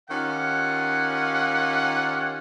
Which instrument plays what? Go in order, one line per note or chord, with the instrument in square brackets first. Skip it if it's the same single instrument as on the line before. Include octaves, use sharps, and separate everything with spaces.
[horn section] D#3 C#4 F4 G4 F5 F#5